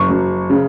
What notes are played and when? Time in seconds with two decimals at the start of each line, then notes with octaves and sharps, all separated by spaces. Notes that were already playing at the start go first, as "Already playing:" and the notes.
Already playing: F#1 C#6
0.09 F#2
0.50 C#3